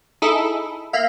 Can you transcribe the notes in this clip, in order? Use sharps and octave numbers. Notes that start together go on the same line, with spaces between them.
D#4 E4 G#4 A4 E5
A#3 E5 F5